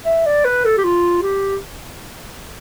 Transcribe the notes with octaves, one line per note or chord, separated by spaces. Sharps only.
E5
D5
B4
A4
G4
F4
G4